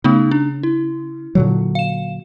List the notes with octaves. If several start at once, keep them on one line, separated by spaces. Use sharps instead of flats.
C#3 A3 B3 D#4
D4
E4
A#2 D3 F#3
F5 E7